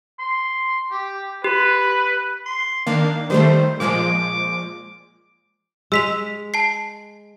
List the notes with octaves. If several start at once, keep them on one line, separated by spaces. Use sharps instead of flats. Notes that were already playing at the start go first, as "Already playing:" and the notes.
C6
G4
G4 B4
C6
D#3 A#3 D4 F5
D#3 G3 A3 C5
A#2 F3 G#3 D6
G#3 E6 B6 F7
A5 C7